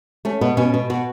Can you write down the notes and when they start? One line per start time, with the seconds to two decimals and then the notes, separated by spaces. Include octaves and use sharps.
0.25 A3 C#4
0.41 B2 B3
0.57 B2 C#4
0.74 B2
0.90 B2 F#4